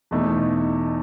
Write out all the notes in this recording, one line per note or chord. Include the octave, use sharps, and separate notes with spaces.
E2 B2 A3 D#4